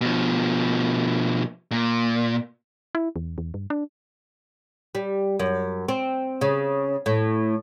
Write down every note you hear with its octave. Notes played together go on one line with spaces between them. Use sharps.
B2 F3
A#2
E4
E2
E2
G2
D4
G3
F#2
C4
C#3
A2